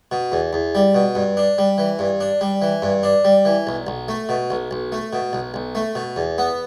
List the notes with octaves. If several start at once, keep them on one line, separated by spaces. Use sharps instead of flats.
B2
E2
E2
G3
B2
G2
D4
G3
E3
G2
D4
G3
E3
G2
D4
G3
E3
B1
B1
A3
B2
B1
B1
A3
B2
B1
B1
A3
B2
E2
B3